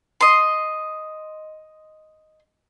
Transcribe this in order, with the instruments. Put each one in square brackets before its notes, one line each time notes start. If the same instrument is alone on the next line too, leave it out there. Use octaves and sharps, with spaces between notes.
[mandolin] D#5 C6